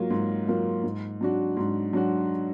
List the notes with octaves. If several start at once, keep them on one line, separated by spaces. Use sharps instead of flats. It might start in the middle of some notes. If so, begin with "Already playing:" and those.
Already playing: G#2 F#3 A#3 F4
G#2
F#3 A#3 F4
G#2
F#3 D4 F#4
G#2
F#3 D4 F#4